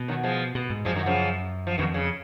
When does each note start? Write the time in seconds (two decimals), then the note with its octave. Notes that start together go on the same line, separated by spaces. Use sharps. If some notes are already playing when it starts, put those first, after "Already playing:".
Already playing: B2
0.08 D#3 F#3
0.23 F3 G#3
0.55 B2
0.70 G#2
0.85 F#2 F3 G#3
0.96 D#3 F#3
1.06 C#3 F3
1.67 F3
1.78 F2 B2 D#3
1.94 C#3